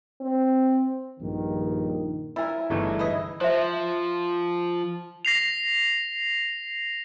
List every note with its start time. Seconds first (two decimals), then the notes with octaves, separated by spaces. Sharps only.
0.21 C4
1.20 A#1 G2 D#3
2.36 F3 E4 A#4 G#5
2.70 G1 G2 C#3 E3 A3 D#4
2.99 E4 B4 D#5
3.41 F3 C5 E5
5.25 A#6 C7 F7